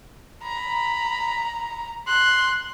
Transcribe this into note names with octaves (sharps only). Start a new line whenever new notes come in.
A#5 B5
C6 F#6